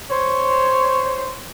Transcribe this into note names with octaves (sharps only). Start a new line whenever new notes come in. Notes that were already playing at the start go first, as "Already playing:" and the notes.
C5 C#5